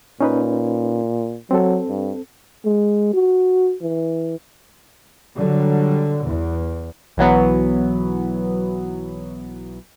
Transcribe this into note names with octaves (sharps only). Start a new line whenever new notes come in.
A#2 C#4 D#4 B4
F#3 C4 A4
G2
G#3
F#4
E3
D3 F#3 G3
E2
B1 E3 F#3 B3